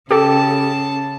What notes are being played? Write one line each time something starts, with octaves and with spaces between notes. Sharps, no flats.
C#3 G4 A4 A5